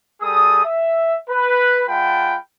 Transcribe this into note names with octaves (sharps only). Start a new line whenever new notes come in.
G3 G#4 A4 D#6
E5
B4
G#3 F4 F#5 G5 A5 B5